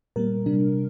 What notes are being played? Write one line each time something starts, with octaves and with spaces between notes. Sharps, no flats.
A#2 G3 A#3 A#4
C3 G3 D4